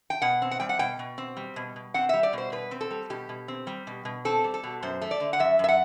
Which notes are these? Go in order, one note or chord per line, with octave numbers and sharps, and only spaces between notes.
G5
B2 F#5
C4
F#5
G3 G5
F#5
B2 G5
B2
C4
G3
B2
B2
C4 F#5
G3 E5
D5
B2 C5
B2 B4
C4
A4
G3
B2 G4
B2
C4
G3
B2
B2
C4 A4
G3
A4
B2
F#2 C5
A3
D5
D3
F#5
F#2 E5
F#2 E5
F#5